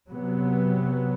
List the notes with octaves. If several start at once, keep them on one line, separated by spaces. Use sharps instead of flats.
C3 F#3 B3